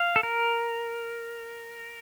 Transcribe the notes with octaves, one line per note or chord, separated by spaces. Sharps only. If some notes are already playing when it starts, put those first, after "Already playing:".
Already playing: F5
A4
A#4